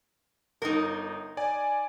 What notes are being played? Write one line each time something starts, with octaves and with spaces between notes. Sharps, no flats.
G1 D#4 A#4
D5 G#5